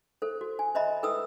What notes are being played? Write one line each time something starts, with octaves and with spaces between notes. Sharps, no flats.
A4 C5
F#4
G#5
C5 D#5 E5 A#5 B5
A4 B4 G5 D#6 E6